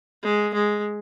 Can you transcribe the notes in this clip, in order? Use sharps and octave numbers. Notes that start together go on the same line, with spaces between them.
G#3
G#3